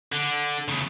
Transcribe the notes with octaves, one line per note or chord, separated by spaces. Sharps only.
D3
E2 C#3